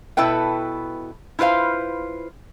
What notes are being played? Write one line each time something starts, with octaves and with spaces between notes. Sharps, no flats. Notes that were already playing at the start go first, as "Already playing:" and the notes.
B2 E4 A4 B4 G5
E4 F4 B4 C5 F5